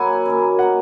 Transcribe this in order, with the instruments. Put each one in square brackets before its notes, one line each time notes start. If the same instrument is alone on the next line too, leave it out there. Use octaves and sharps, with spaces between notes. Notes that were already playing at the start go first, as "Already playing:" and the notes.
Already playing: [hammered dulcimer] F#3 A#3 E4 [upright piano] F#5 G#5
[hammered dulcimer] F#2 D#3 A#3
[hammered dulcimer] D#3 A#3 [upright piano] F#5